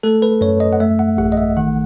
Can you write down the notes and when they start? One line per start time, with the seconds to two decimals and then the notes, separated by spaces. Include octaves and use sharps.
0.03 A3 A4
0.22 B4
0.41 F#2 C#5
0.60 D#5
0.73 F#5
0.80 A3 E5
0.99 F#5
1.18 A1 F#5
1.32 D#5
1.37 E5
1.57 D#3 F#5